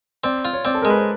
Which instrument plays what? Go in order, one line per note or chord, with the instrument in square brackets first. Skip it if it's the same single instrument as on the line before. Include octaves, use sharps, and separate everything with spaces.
[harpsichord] C4 [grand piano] D5
[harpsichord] F4
[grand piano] C#5
[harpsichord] C4 [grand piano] D5
[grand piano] A4
A#4
[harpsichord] G#3 [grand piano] B4
[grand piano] C5